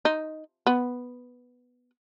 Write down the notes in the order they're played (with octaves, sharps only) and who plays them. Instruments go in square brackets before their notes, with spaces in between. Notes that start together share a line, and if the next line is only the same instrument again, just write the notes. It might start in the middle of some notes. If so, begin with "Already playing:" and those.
[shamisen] D#4
B3